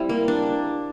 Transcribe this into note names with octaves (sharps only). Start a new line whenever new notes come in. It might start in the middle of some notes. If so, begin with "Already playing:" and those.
Already playing: G3 C4 E4
A#3
D4